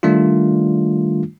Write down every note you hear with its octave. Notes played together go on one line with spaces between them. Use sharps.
D#3 G3 A3 D4 F4